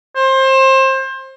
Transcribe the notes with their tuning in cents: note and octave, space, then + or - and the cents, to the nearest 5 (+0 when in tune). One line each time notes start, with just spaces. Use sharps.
C5 +25